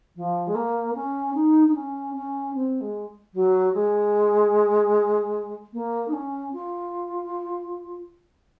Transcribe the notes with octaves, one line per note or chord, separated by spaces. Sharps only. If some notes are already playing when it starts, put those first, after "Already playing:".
F3
G#3
A#3
C#4
D#4
D#4
C#4
C#4
C4
G#3
F#3
G#3
A#3
D#4
C#4
F4